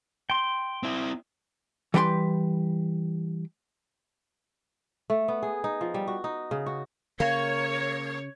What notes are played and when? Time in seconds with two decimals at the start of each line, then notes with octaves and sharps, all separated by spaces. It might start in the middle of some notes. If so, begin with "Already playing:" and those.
0.30 G5 C6
0.83 C4 E4
1.94 E3 G3 B4 G5 A#5 C6
5.10 A3
5.28 B3
5.43 G#4
5.64 D#4
5.81 F3
5.94 G3
6.08 F#4
6.24 D#4
6.51 C#3
6.66 F#4
7.20 C#3 A#3 C#5